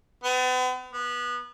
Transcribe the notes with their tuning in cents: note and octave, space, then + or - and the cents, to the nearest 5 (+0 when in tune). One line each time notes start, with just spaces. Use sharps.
B3 +45
B3 -20